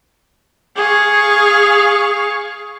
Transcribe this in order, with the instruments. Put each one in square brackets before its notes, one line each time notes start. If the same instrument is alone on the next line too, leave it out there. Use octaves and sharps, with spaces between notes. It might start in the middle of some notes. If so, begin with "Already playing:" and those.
[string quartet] G#4 F5 C#6